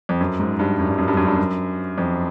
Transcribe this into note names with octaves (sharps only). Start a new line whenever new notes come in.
F2
F#2
G#2
G2
F#2
G2
F#2
G2
F#2
G2
F#2
F2